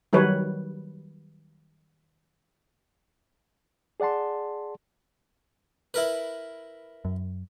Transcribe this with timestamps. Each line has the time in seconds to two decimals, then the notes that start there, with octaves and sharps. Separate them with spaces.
0.13 D#3 F#3 G3 B4 C#5
4.00 G#4 D5 F#5 A5 C6
5.94 E4 A#4 B4
7.05 F#2